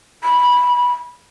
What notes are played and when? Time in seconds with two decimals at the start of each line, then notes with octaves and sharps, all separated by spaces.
0.24 B5